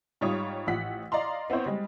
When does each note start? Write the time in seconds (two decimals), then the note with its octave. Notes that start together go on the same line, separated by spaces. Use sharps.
0.21 G#2 G3 F4 C#5 D#6
0.67 A1 F3 F#5 B6
1.12 D5 D#5 F5 A#5 C6
1.50 B3 C4 E4 C5 C#5
1.66 G3 G#3